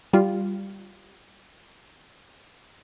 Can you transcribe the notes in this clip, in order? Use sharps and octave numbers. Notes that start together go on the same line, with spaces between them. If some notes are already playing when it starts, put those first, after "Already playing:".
G3 F4